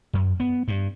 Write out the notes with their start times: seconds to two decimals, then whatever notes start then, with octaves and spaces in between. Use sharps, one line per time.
0.13 F#2
0.40 B3
0.68 G2